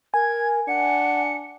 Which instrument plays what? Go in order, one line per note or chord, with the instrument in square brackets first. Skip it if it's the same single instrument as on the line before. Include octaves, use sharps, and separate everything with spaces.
[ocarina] A#4 [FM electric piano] G#5 [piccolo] G#6
[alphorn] D4 [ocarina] F#5 [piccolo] C#7